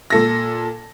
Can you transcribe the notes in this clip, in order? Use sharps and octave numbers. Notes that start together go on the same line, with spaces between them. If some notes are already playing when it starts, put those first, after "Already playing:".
A#2 A4 A#6